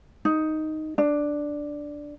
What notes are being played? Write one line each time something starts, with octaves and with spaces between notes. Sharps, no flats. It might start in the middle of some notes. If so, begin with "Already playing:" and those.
D#4
D4